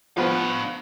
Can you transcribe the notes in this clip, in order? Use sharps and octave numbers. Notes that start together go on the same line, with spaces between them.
F3 B3 D4 F5